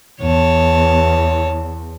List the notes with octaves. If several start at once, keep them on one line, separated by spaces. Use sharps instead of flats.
E2 C#5 A5